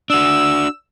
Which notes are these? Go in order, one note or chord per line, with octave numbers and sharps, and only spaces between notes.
D4 F#4 E6